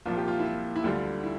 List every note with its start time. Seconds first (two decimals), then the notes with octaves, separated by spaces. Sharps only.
0.05 C2 A#2 F3 F4
0.17 G4
0.28 F4
0.39 E4
0.45 F4
0.76 E4
0.84 D2 D3 G3 F4
1.24 E4